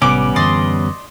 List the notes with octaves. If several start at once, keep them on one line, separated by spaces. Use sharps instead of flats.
A1 C3 G3 B3 C#4 D6
F#2 D3 E3 D5 D#5 C6